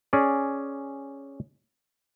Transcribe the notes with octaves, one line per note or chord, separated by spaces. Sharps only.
C#4 G#4 D5